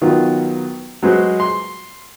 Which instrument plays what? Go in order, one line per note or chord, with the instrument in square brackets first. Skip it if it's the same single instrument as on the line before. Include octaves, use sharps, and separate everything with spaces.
[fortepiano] D#3 F#3 B3 F4
F#3 G#3 B4 C5
C6